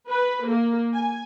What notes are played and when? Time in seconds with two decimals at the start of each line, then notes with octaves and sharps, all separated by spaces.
0.10 B4
0.47 A#3
0.94 G#5